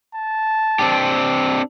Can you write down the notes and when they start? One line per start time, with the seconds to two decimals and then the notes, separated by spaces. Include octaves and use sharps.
0.15 A5
0.79 C4 D4 G4